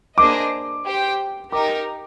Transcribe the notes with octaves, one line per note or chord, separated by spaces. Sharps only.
A#3 D4 G#4 C5 D#5 D6
G4 C5 G5
D#4 G4 A#4 D6